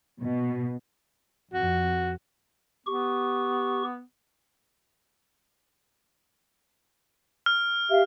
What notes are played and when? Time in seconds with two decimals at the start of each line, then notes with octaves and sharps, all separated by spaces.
0.21 B2
1.54 F2 F#4
2.87 B3 G4 C#6
7.46 F6
7.90 G4 E5 F5